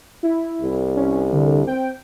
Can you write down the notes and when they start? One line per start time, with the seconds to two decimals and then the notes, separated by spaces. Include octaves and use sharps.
0.23 E4
0.61 C2
0.96 C#4
1.32 D3
1.67 C4 G5